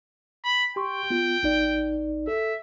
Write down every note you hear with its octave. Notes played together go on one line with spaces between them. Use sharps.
B5
G4 G5 C6 C#6
B3 F4
A1 D#4 D5
A4 E5